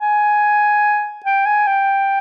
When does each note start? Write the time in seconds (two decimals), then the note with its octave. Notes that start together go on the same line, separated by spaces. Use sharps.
0.01 G#5
1.26 G5
1.46 G#5
1.67 G5